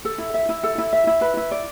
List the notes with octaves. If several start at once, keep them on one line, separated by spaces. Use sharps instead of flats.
A4
E4
E5
E4
A4
E4
E5
E4
B4
E4
D5